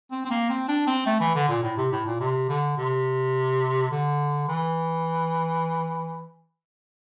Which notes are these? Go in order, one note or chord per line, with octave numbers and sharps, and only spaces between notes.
C4
C4
A#3
C4
D4
C4
A3
E3
D3
A#2
A2
C3
A2
A#2
C3
D3
C3
D3
E3